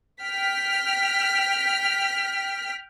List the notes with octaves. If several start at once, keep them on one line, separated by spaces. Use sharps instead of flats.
G5 F6 B6